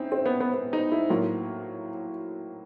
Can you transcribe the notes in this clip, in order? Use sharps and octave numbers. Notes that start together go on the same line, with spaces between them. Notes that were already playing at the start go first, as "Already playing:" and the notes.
Already playing: C4 C#4 D#4 E4
C4
B3
B3
B3
D#4
E4
A2 F#3 A#3 F4